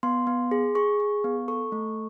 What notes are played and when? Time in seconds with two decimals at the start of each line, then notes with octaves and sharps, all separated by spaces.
0.03 B3 C6
0.27 B3
0.51 G#4
0.75 G#4 C#6
1.00 G#4
1.24 B3
1.48 A4 C#6
1.72 A3